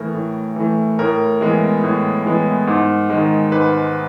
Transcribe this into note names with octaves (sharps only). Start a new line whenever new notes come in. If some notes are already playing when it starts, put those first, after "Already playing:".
Already playing: A2 E3 A3 A#4
A2
E3 A3
A2 A#4
E3 G#3 B3
A2
E3 G#3 B3
G#2
D#3 G#3
G#2 B4